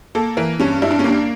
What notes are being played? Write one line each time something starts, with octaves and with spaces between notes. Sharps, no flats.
A#3 A4
E3 A#4
G2 C#4
G2 E4
D4
C#4
A#3 D4